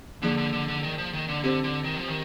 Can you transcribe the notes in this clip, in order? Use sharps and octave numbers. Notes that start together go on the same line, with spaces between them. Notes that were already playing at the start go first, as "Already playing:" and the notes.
D3 F3 A#3 D#4 G#4 D5
D3
D3
D3
D#3
F3
D#3
D3
D3 C4 G4 C5
D3
D#3
F3
D#3